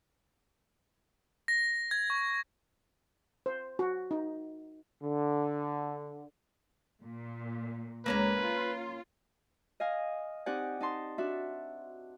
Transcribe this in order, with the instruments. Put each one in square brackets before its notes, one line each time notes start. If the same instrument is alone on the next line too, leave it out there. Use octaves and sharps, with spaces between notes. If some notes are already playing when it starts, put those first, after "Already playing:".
[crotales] A#6
G#6
C#6
[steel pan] C5
F#4
D#4
[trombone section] D3
[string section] A#2
[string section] C#2 [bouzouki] A#3 C#4 A#5 [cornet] B4
[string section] F4
[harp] D#5 F5 G#5
C4 D#4 G4 D5 F#5 G#5
D#4 A5 C6
D4 F#4 E5